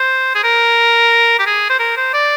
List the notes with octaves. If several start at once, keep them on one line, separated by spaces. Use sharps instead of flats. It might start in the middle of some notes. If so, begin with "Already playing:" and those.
Already playing: C5
G#4
A#4
G4
G#4
C5
A#4
C5
D5